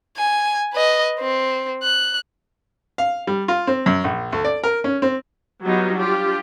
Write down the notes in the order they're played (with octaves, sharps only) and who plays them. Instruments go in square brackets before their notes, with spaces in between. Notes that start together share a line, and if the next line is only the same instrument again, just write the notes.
[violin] G#5
B4 D#5
C4
F#6
[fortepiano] F5
G3
F4
C4
F#2
A#1
D2
D5
A#4
C#4
C4
[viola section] F#3 G3 B3 D#4 F4
D4 F4 G4